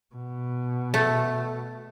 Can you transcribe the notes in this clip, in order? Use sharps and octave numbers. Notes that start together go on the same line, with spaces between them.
B2
A3